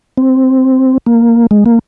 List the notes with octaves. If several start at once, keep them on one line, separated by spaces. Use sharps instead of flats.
C4
A#3
G#3
A#3